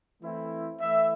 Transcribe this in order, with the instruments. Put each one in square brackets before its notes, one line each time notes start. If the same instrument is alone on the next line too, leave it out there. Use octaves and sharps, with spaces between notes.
[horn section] E3 A3 C4 E4
E3 A3 E4 E5